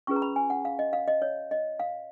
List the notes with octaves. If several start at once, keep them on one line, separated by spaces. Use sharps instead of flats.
C#4 F4 G#4 B4 C#6
A#5
B5
G#5
F#5
F5
D#5
F5
D#5
C#5
D#5
F5